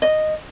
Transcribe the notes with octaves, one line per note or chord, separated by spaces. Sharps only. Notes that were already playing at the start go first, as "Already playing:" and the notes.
D#5